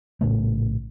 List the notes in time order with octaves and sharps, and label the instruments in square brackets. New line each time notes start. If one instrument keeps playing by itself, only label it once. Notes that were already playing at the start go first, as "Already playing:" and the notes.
[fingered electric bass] A#1 A2 C#3 A3